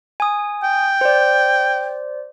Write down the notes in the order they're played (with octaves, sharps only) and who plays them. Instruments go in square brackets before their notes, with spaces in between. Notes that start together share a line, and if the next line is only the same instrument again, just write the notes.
[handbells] G#5 D#6
[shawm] G5
[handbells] C5 D5